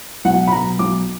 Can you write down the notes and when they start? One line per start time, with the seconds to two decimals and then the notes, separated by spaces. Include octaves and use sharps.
0.25 B1 F#5
0.47 B5
0.52 B2 F#3 A#5
0.79 B1 D6